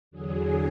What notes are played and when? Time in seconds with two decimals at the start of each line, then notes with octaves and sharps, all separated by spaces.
0.11 E2 D3 F#3 G#4